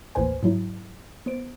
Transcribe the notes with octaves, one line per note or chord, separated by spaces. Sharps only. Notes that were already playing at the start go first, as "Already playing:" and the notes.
A1 D#2 A2 B4 C5 G#5
G#2 F#3 E4
B3 C5 D7